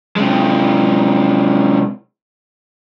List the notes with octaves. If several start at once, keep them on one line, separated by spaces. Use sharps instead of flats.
C3 G#3